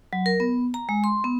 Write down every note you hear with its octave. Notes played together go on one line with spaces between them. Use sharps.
F#3
A#4
B3
A#5
G#3
C6
B3